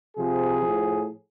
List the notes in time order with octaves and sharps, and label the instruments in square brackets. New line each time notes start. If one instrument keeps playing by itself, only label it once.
[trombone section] C3 F3 G#4
A2 F3